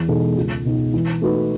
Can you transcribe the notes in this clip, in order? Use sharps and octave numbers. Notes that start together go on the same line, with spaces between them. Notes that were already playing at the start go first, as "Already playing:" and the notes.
Already playing: E2
B2 G#3 D#4 A4
C#2
B2 G#3 D#4
E3
A3 D#4 F#4 B4